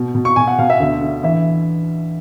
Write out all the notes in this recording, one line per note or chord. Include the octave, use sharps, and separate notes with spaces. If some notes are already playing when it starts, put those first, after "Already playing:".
Already playing: B2
B2
C#6
B2 G#5
F#5
B2 F5
E5
D2
D3
E3 E5